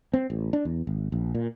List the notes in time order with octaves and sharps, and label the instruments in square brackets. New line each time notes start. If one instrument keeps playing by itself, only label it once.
[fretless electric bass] C4
A1
D4
E2
G#1
A#1
A#2